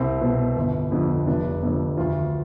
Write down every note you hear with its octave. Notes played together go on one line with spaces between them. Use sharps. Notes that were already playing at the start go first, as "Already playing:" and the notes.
Already playing: C2 C4
B2
G1
F2 D3
F1 D4
F2 D3
D2 F4